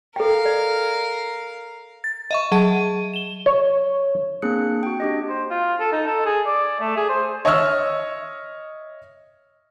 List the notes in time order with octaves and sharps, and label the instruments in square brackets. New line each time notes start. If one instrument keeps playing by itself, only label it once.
[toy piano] A4 G5 [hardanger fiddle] A#4 F5
[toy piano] D5
[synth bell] A6
D#5 E5 C#6
F#3 G#4 A5 D#7
E7 G7
[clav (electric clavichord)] C#5
[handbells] A#3 C4 D4 G#4 F#6 C#7
F#4 G5
D4 G4 D#5
[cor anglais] C5
F4
A4
D#4
A4
G#4
D5
A3
G#4
C5
[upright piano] C#5 D#5 E5 C#6 E6 F6